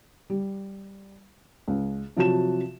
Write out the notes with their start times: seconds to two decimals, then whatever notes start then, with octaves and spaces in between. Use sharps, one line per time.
0.30 G3
1.68 C#2
2.17 C3 F3 F#3 F#4 A5 E7